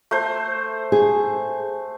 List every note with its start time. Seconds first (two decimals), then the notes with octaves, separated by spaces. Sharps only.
0.11 A3 C5
0.92 G#4